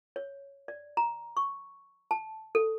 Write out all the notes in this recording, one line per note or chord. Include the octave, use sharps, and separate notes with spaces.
C#5
D5
A#5
C#6
A5
A4